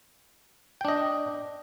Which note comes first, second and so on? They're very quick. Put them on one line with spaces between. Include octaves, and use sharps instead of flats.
G5 D4 D#5